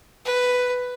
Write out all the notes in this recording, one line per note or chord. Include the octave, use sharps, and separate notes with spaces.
B4